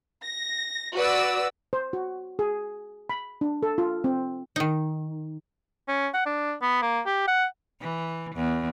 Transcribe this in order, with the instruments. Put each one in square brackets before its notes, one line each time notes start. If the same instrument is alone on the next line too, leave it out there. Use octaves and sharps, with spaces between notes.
[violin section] A#6
F#4 B4 D5 E6
[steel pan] C5
F#4
G#4
B5
D4
A4
F4
C4
[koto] D#3 D#4
[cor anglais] C#4
F#5
D4
B3
A#3
G4
F#5
[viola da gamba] E3
E2